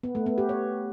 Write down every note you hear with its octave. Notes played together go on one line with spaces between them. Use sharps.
B3
A3
B3
G4
C#5